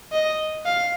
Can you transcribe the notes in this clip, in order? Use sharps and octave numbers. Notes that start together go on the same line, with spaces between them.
D#5
F5